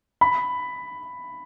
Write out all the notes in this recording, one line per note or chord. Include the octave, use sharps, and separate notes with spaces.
B5